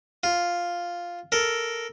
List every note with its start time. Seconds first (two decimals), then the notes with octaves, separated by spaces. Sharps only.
0.24 F4
1.32 A4 A#4